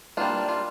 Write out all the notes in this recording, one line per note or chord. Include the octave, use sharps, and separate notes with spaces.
G3 A#3 D4 F4
F4